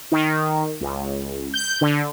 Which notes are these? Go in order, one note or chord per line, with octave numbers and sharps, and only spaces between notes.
D#3
C#2
G6
D3